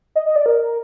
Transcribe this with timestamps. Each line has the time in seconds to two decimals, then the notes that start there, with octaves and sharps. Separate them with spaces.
0.16 D#5
0.26 D#5
0.36 D5
0.46 A#4